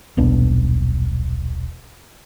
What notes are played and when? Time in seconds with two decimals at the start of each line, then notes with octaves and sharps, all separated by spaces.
0.17 D#1 B1 B3 D4